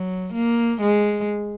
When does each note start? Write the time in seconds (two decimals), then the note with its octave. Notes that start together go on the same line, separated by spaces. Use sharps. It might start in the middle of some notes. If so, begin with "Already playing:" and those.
Already playing: F#3
0.34 A#3
0.81 G#3